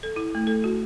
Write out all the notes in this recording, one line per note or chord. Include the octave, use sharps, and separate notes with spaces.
A4
E4
A3
A4
F#4